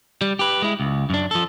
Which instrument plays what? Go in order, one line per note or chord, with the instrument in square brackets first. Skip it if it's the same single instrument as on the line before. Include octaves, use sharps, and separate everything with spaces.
[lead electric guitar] G3
G4 B4
G#3 E4
C#2
F#2 D4
F3 A4